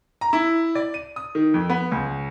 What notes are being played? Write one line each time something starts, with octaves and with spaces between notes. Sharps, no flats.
A#5
E4
D5
D#7
D#6
D#3
F2
B3
C#2